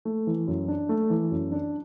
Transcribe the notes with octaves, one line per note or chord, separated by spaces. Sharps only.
A3
E3
F#2
D4
A3
E3
F#2
D4